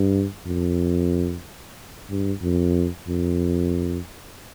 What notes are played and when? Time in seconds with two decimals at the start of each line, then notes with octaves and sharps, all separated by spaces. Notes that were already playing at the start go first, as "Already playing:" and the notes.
Already playing: G2
0.46 F2
2.10 G2
2.42 F2
3.08 F2